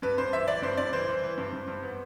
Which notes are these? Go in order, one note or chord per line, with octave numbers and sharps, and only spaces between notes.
G2 B4
G2 C5
E3 E5
E3 D5
G2 C5
G2 D5
E3 C5
E3
E3
G2
G2
G2
B3